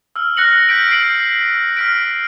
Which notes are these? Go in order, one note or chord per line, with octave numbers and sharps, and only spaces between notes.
E6 F6
F6 F#6 A#6 C#7 F#7
G6 B6 D7
C7 D7 F#7
F6 B6 D7